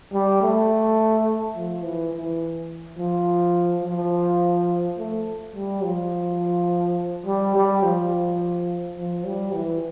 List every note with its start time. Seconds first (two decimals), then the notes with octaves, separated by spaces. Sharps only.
0.13 G3
0.42 A3
1.56 F3
1.84 E3
2.13 E3
2.99 F3
3.84 F3
4.98 A3
5.55 G3
5.84 F3
7.26 G3
7.55 G3
7.83 F3
8.97 F3
9.26 G3
9.54 E3